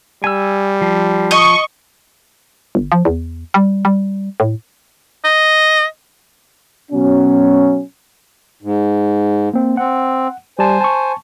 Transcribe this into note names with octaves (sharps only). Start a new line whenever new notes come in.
G3 G#5 E6
F3
D#5 C#6
G1
F3
E2
G3
G3
A2
D#5
B2 F#3 C#4
G#2
A#3 C4
C4 F#5
G3 C5 G#5 A5
A5 C#6